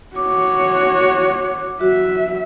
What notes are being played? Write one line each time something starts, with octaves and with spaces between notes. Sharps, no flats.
F#4 C#5 D6
F#3 F#4 E5